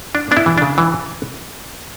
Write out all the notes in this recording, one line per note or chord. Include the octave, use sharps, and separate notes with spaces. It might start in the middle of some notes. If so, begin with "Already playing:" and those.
D4
B3 D4
E4
E3
C#3 D4
E3